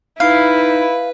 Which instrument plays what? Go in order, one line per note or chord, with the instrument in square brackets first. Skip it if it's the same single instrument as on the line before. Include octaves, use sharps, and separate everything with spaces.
[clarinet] D#4 [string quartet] E4 [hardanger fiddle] B4 [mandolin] F5